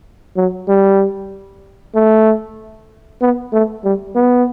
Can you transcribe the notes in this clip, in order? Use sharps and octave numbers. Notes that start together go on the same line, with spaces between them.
F#3
G3
A3
B3
A3
G3
B3